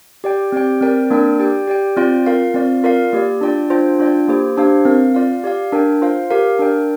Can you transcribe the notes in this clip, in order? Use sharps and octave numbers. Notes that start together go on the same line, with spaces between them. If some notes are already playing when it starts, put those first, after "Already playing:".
G4 D5 G5
C4 G4 D5 G5
C4 A#4 D5 G5
A#3 D4 A#4 D5 G5
G4 D5 G5
G4 D5 G5
C4 F4 D5 G5
F4 A#4 F5
C4 F4 D5 F5
F4 A#4 D5 F5
A#3 G4 D5
D4 F4 D5 G5
D4 F4 C5 G5
D4 F4 D5 G5
A#3 G4 C5
D4 G4 C5 F5
C4 A#4 F5
F4 D5 F5
G4 D5 F5
D4 A#4 G5
F4 C5 F5
G4 A#4 F5
D4 A#4 D5 G5